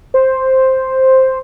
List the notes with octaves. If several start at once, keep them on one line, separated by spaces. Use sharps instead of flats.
C5